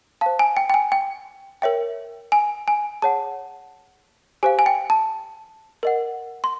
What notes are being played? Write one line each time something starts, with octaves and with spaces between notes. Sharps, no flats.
C5 F5 A5
G#5
G5
G5
G#5
G5
A#4 C#5 E5 G5
G#5
G#5
G#4 C#5 F#5 A5
G4 C5 F5 G#5
G#5
G5
A5
A#4 D#5 F#5
C6